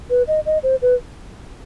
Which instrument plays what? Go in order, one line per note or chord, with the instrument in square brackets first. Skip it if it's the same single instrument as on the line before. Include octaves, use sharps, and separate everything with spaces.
[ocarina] B4
D#5
D#5
C5
B4